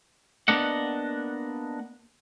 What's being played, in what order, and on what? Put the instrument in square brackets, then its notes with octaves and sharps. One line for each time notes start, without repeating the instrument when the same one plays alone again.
[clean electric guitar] A#3 B3 D4 D#5 F#5